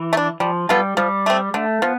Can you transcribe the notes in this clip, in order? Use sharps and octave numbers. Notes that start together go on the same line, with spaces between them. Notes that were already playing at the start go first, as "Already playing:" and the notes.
Already playing: E3
A3
D4
F3 G3
G3 B3 F4 A4
F3 G3
A3 C4
D3 A3
F3 B3